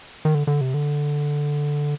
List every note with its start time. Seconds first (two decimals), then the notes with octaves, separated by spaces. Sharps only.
0.25 D#3
0.35 D3
0.47 D3
0.61 C3
0.74 D3